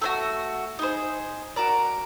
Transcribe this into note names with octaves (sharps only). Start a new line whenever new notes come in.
A3 D4 F#4
D#4 G#4 C5
F#4 A#4 D5